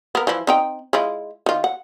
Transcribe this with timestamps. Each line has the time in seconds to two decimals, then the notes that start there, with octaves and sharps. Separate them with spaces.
0.15 B3 A#4
0.27 E3 F3 E4
0.47 C4 D#4 G5
0.93 G#3 E4 F4
1.46 D#3 F4
1.64 F#5